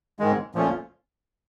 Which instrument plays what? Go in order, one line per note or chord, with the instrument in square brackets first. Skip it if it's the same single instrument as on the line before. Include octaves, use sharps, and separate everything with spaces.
[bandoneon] G#2 D#3 G#3
A#2 F3 A3 C#4 F4